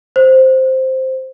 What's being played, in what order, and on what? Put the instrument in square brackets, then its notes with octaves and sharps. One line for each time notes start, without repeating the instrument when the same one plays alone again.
[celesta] C5